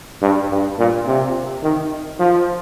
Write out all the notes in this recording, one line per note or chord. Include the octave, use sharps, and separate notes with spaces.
G2
G2
A#2
C3
D#3
F3